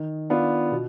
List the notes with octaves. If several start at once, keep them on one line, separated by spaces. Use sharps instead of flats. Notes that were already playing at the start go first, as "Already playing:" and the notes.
Already playing: D#3
B3 D4 F4
B2